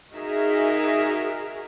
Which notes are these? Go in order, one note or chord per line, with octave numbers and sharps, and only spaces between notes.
D#4 F#4 G#4 A#4 E5